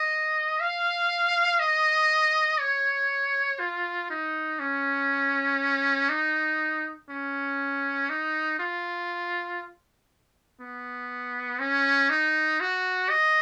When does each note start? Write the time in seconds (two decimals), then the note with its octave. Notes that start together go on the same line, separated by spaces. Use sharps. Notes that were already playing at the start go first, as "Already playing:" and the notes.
Already playing: D#5
0.60 F5
1.59 D#5
2.59 C#5
3.59 F4
4.10 D#4
4.60 C#4
6.09 D#4
7.10 C#4
8.09 D#4
8.59 F4
10.61 B3
11.59 C#4
12.10 D#4
12.60 F#4
13.10 D#5